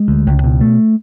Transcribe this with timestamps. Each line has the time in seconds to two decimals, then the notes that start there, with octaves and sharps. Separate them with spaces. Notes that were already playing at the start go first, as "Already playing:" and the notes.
Already playing: G#3
0.08 D2
0.26 C#2
0.44 B2
0.61 A3